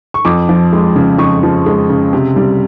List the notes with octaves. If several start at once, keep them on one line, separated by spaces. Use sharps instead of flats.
C#6
F2 D6
F3
G#3
C#3
F2 C#6
F3
G#3
C#3
C3
G3